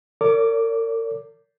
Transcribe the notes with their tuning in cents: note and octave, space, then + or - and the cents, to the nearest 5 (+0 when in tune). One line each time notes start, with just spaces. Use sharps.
A#4 -40 C#5 +45 D6 +0